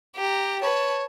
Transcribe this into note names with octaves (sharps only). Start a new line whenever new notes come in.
G4 A#5
B4 C#5 A5